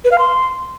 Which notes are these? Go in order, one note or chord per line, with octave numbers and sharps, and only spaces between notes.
B4
F5
C6